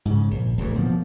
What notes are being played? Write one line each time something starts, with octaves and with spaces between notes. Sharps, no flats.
G#2 C#3
A#1
D1 D2 E3
B2 F3 A3 A#3